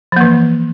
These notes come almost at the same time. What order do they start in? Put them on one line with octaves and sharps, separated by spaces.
F3 A#3 E3